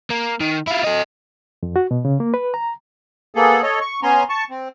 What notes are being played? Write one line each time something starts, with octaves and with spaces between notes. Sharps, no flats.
A#3
D#3
E4 F4
A4 D#5
F2
F#4
B2
C#3
A#3
B4
A#5
A#3 B3 G#4 A4
A4 C#5 D#5
C#6
B3 C#4 G#5 A#5 C6
A5 C#6
C4